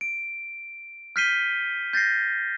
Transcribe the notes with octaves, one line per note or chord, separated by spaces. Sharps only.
D7
F6 G6 B6 C7 D#7 G7
G6 A6 A#6 C7